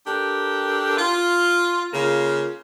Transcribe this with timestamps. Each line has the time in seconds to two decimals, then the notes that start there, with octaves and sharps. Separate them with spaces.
0.06 D4 G4 A4 A#4
0.98 F4
1.93 C#3 A#3 F4